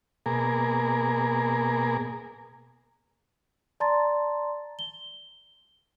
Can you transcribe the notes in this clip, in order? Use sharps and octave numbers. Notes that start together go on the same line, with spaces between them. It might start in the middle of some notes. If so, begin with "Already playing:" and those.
B2 A#3 G#4 A#4
D5 A5 A#5 C6 A6
G7